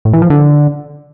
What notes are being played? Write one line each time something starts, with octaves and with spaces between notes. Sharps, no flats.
A2
E3
F3
D3